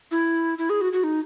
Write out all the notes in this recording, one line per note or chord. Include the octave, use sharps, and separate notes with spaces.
E4
E4
G#4
F#4
F#4
D#4